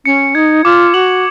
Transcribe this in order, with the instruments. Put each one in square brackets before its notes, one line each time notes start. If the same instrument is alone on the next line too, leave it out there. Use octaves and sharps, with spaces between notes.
[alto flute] C#4 [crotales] C#7
[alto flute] D#4 [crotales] G#6
[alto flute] F4 [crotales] D6
[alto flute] F#4 [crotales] F#7